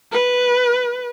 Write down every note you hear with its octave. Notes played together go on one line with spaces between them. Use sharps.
B4